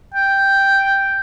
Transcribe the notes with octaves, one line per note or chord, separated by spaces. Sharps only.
G5